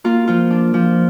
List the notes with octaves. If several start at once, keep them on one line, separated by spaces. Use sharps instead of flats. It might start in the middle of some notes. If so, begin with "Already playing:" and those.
A#3 F4
F3 F4
D4
F3